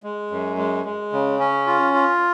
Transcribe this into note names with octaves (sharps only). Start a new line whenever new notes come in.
G#3
F#2
G#3
G#3
C#3
C#4
F4
F4